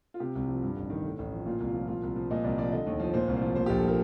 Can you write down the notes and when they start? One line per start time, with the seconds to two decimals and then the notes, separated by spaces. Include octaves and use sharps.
0.14 F4
0.20 C3 G4
0.35 C2
0.48 F3
0.62 G2
0.77 A1
0.90 D#3
1.04 A2
1.19 A1
1.32 F3
1.46 A#2 F4
1.60 C2
1.67 F4
1.74 F3
1.88 A#2 F4
2.03 C2
2.16 F3
2.30 A#2 D#5
2.44 C2 D5
2.58 F3 D5
2.72 D3 D#5
2.87 D#2
3.00 F3
3.14 A#2 C5
3.28 C2
3.36 C5
3.42 F3
3.55 A#2 C5
3.66 G4
3.69 A#1
3.76 A4
3.84 F3 A#4